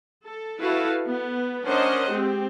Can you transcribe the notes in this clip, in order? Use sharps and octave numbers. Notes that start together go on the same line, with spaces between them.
A4
E4 F#4 A4 B4 F5
B3
C#4 D4 A#4 C5 D#5 F#5
G#3 C4 G4